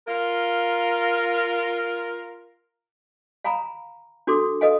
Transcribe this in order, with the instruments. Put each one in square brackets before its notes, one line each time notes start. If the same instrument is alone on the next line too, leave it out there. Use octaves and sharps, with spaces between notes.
[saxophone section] F4 A#4
[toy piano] F5 G#5 A#5 B5
D4 F#4 A4 C6 D6
A4 B4 D#5 F5 G#5